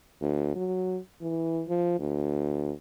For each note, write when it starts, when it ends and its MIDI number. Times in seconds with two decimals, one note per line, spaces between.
0.21 0.53 38
0.55 0.99 54
1.22 1.63 52
1.68 1.97 53
1.99 2.72 38